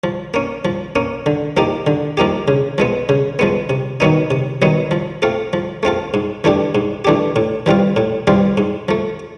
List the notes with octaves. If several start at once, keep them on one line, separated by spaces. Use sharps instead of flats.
F3
A#3 C#4
F3
A#3 C#4
D3
F3 A#3 D#4 G4
D3
F3 A#3 D#4 G4
C#3
F3 G#3 B3
C#3
F3 G#3 B3
C3
D#3 F#3 B3 D#4
C3
D#3 F#3 B3 D#4
F3
A3 C4 F4 A4
F3
A3 C4 F4 A4
G#2
E3 A3 D4 G4
G#2
E3 A3 D4 G4
A2
E3 G3 C4 F4
A2
E3 G3 C4 F4
G#2
F3 A3